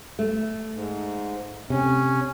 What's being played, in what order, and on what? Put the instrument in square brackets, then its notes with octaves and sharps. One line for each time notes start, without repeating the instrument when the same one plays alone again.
[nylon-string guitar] A3
[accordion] G#2
[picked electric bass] C3 [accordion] C#4